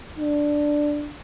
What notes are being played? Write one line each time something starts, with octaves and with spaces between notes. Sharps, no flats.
D4